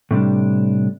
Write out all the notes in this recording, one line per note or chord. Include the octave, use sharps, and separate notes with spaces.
A2 C3 G3 D4